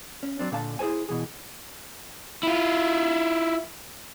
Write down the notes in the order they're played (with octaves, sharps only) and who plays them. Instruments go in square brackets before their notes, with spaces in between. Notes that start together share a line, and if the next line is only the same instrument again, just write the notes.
[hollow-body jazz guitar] C#4
F#3 G3 C4 D4
A#2 D3 F5 A5
E4 G#4 A4 C5 G#5
B2 E3 G#4
[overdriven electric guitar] E4 F4